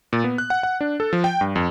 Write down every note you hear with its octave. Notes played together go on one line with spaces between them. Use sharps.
A#2
B3
F#6
F#5
F#5
D4
A4
F3
G5
G2
F2